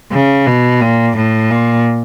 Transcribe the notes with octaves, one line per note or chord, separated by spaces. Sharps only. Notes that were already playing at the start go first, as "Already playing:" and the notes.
C#3
B2
A#2
A2
A#2